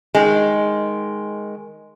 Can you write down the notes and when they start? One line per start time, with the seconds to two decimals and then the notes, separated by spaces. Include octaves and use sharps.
0.15 D#3 G#3